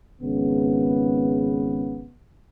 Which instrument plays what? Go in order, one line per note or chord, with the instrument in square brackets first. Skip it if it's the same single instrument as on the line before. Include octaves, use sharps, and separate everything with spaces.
[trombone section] G#1 C#3 B3